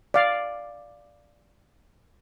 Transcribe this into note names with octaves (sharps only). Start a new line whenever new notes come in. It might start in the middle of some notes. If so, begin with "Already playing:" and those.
D5 F5